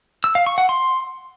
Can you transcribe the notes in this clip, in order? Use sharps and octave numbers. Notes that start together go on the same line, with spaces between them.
E6
F5
C#6
F#5
C6